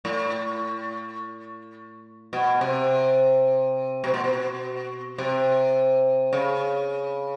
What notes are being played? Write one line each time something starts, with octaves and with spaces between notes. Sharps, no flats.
A2
B2
C3
B2
A#2
B2
C3
C#3